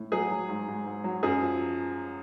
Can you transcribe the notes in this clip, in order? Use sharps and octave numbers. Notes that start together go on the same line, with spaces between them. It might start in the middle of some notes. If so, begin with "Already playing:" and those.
Already playing: A2
F#3 G#4
F#3
G#2
G#2
G#2
F#3
F#2 G#4
F3